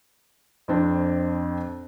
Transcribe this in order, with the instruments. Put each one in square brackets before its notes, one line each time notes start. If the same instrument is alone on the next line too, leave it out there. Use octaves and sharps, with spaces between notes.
[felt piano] F2 C4 D4